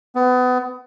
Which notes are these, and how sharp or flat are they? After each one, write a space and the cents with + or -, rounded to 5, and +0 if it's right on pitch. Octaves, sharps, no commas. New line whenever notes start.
B3 +30